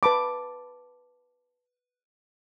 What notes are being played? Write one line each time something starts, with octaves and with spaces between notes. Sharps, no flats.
B4 A5 B5 D6